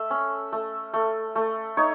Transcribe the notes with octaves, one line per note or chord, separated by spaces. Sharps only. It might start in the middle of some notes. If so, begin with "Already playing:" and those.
Already playing: A3 E5
C#4
A3
A3
A3
D#4 C#5